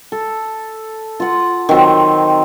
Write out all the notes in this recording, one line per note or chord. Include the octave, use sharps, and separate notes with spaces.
A4
F4 F#5
D#3 F#3 C4